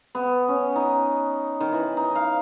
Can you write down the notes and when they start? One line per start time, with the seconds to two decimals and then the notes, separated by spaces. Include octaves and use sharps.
0.15 B3
0.48 C#4
0.76 D#4
1.61 D#3
1.73 E3
1.97 D#4
2.15 F5